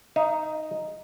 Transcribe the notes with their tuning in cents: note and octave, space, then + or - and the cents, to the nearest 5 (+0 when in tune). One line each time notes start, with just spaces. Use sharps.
D#4 +0 E5 +45